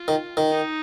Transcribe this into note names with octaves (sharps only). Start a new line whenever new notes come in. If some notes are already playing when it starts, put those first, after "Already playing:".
Already playing: F4
D#3
D#3
D#4